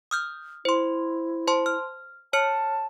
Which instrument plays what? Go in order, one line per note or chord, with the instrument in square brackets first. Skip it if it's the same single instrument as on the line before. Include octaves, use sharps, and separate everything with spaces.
[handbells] D#6 F6 G6
[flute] E4 [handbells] C5 C6
[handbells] C5 A5 C6
F6
[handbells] C#5 F6 C#7 [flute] A5